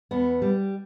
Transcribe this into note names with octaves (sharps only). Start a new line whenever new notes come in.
E2 B3
G3